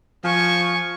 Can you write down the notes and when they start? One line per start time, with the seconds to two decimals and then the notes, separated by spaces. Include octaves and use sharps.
0.24 F3 G#5 C#6